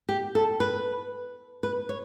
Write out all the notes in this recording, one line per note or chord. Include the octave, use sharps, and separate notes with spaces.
G4
A4
B4
B4
C#5